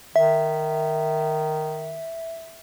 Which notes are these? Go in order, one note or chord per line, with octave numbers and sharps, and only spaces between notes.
D#3 E5